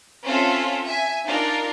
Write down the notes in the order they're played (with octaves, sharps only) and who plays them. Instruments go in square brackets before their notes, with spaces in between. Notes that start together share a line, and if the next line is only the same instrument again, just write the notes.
[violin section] C4 C#4 F4 A4 E5
E5 G#5
D4 D#4 F4 A#4 D5